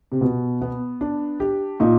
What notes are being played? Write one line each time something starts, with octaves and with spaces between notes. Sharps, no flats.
C3
B2 B3
B3
D4
G4
A#2 D#4